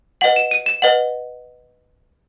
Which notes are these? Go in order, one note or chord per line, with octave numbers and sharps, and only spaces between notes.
B4 D#5 F#5 F#7
E7
D#7
E7
B4 D#5 F#5 F#7